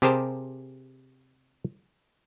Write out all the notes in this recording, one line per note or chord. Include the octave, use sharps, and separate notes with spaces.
C3 G4 G#4 A#4 C5 A5